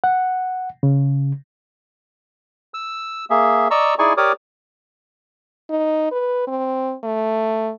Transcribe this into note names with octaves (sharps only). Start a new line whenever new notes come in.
F#5
C#3
E6
A#3 G#4 E5
D5 D#5 A#5 C#6 E6
D#4 E4 G#4 D5 G#5 C#6
G4 A#4 C#5 D5 D6 D#6
D#4
B4
C4
A3